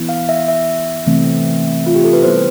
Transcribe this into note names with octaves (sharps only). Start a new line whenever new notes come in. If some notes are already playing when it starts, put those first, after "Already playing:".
Already playing: E3 B3 E4
F5
E5
E5
C3 E3 A3 C4
F4
G4
A4
B4
G3 B3 E4 G4 C5